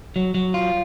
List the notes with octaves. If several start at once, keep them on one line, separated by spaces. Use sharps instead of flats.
F#3
F#3
F4